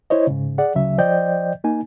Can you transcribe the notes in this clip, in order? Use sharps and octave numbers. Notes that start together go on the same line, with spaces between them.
E4 C5 C#5 D#5
G#2 C#3
G#4 D5 F#5
D2 C#3 F#3 E5
F3 C5 D5 D#5 G5 G6
A#3 D#4 G#5